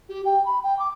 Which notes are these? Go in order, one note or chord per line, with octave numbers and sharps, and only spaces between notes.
G4
G5
B5
G5
D6